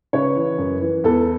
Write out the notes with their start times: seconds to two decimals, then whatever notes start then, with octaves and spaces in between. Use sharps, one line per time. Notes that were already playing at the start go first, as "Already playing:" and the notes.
0.13 C#3 B4 C#5
0.36 E3
0.58 F#2
0.81 E3
1.04 E2 A4 B4